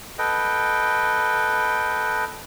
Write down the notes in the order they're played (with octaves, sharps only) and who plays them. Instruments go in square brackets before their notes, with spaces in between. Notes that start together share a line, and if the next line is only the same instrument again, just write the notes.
[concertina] A4 B4 D#5 G5